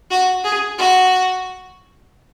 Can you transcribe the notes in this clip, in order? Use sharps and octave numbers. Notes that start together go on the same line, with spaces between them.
F#4
G#4
F#4